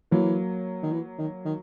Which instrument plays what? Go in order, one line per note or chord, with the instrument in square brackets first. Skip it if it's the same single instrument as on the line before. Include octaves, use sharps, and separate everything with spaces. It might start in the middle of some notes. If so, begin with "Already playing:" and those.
[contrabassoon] E3 [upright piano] F#3 A#3
[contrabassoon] D#3
E3
D#3
D#3